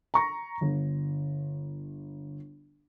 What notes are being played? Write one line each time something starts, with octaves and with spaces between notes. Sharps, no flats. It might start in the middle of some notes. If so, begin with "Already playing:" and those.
A#5 C#6 A#6
G1